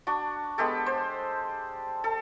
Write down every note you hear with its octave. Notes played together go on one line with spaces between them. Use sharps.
D4 F#4
G#3 B3 G4 A4
C5
A4